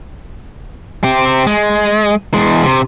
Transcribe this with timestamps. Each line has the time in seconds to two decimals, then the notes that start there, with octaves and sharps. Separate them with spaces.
1.04 C4 G4
1.47 G#3
2.34 E2 G#3
2.64 C3